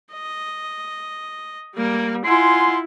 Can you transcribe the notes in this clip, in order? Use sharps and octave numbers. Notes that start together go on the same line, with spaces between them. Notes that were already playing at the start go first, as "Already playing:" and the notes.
D#5
G3 A#3
E4 F4 F#5 G#5 C6